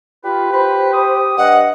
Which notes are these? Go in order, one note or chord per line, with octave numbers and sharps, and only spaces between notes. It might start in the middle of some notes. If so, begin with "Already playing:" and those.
F4 G4 B4
B4 C5
D#6
G2 D#5 F#5